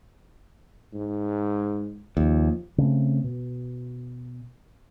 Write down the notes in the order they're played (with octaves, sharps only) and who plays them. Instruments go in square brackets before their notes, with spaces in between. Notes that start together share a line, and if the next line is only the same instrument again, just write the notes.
[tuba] G#2
[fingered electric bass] D#2 [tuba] F3
[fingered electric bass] C#3 A3 C4
B2